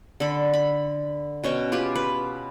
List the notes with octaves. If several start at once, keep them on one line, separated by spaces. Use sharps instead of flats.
D3 A4 B5
B5
B2 C#4 G5 C#6
F4 G4 B4 G#5
B4